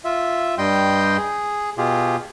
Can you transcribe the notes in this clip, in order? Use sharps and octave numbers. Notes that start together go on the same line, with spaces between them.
F4 E5
G2 G3 D#5 G5 C6 G6
G#4
B2 F4 G4 G#4